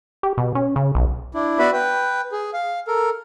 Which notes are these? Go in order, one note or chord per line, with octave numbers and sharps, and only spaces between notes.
G4
B2
C#4
C#3
B1
D4 E4
B3 F#4 B4 D5 E5 B5
B4 G5
G#4
F5
A4 A#4